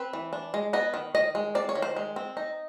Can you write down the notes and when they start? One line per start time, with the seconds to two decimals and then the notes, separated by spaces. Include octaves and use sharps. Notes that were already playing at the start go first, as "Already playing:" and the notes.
Already playing: C4 B4
0.13 E3
0.33 D4
0.54 G#3
0.73 B3 D#5
0.94 D#3
1.15 D#3 D#5
1.35 G#3
1.55 C4 D5
1.69 C#5
1.75 D#3
1.82 C5
1.96 G#3
2.16 C4
2.37 D#4